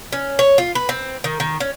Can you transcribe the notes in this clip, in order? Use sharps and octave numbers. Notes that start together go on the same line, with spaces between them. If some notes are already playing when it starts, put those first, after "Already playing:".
C#4
C#5
F4
B4
C4
D#3
D#3
C#4